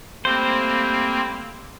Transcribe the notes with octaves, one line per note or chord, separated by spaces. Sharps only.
G3 A3 A#3 C4 C5 B5